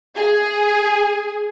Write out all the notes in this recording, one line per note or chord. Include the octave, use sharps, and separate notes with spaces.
G#4